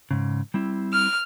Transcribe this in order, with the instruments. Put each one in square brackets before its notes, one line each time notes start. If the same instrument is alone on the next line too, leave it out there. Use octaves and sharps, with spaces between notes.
[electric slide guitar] G#2 C#3
G3 C4 E4
[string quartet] F6